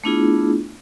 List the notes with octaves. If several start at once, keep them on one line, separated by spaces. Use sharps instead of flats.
A3 B3 D4 E4 F4 G#4